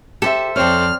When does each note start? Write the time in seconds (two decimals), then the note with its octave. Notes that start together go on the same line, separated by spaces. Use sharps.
0.22 G4 A4 C5 E5
0.56 F2 C4 C#5 D5 F6